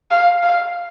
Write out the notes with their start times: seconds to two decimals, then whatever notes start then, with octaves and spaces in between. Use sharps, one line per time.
0.11 F5
0.43 F5